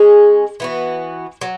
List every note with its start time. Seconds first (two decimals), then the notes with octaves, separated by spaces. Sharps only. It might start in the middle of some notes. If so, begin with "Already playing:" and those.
Already playing: G#3 C#4 G#4
0.60 E3 B3 F#4
1.41 F#3